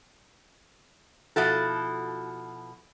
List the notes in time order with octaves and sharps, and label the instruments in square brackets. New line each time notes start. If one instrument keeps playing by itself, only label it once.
[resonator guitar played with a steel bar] B2 F3 E4 F#4 A4